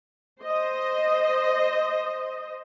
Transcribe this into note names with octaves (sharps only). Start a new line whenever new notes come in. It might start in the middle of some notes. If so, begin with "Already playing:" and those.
C5 D#5